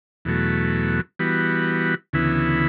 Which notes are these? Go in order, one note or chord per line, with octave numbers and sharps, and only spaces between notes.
E2 B2 F#3 A3
E3 G3 B3 F#4
D2 C#3 E3 B3 E4